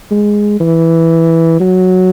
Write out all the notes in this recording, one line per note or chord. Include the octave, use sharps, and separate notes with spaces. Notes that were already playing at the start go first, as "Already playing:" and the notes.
G#3
E3
F#3